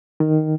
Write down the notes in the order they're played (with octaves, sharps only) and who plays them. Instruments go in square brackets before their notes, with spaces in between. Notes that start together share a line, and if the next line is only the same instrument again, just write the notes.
[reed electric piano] D#3